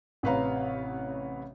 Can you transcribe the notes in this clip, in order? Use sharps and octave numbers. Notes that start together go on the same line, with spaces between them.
A1 C3 B4 C#5 F5 A#5